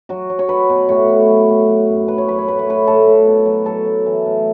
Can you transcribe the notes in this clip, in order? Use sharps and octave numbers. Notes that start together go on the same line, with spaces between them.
F#3 F#4
F#3
C#5
F#3 B4
B2
A2 C#5
A2
F#3
A2
F#3
F#2
F#3 B4
C#5
F#2 B4
C#5
A2 B4
C#5
A2 B4
A2 A4
A2
B2
F#3
F#3 A4
F#3
E3
A2